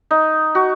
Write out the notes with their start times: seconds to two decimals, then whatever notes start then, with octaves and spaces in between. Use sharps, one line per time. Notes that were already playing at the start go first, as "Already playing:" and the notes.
0.11 D#4
0.55 F#4